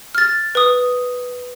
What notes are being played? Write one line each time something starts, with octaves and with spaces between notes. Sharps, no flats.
F6 A6
B4 D#6